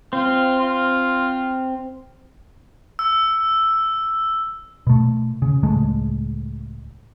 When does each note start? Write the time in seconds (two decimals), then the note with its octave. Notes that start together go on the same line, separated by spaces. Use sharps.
0.13 C4 F4
0.60 F4
2.99 E6
4.87 B2 A3
5.42 C#3
5.63 C#2 A2 G#3 A3